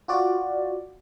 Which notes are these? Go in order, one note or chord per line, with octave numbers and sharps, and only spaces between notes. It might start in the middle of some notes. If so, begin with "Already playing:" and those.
F4 F#4 D5